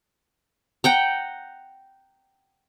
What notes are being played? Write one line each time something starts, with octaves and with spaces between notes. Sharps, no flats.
F#5 G5 A#5